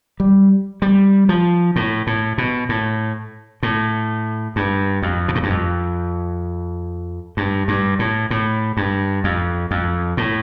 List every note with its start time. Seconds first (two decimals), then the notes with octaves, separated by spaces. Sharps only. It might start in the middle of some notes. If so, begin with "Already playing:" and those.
0.20 G3
0.82 G3
1.29 F3
1.76 A2
2.07 A2
2.38 B2
2.69 A2
3.63 A2
4.56 G2
5.03 F2
5.28 B2
5.35 A2
5.43 G2
5.50 F2
7.37 G2
7.68 G2
7.99 A2
8.31 A2
8.77 G2
9.24 F2
9.71 F2
10.17 A2